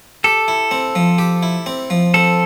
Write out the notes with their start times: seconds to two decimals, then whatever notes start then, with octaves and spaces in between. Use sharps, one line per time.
0.24 G4 A4
0.48 E4
0.71 C4
0.95 F3
1.18 G4
1.43 E4
1.66 C4
1.90 F3
2.14 C4 A4